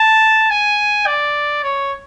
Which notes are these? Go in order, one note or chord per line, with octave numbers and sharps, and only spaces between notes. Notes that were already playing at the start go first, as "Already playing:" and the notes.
Already playing: A5
G#5
D5
C#5